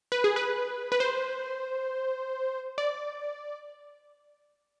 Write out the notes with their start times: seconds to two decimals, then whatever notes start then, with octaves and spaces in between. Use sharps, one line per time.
0.12 B4
0.24 G#4
0.36 B4
0.92 B4
1.00 C5
2.78 D5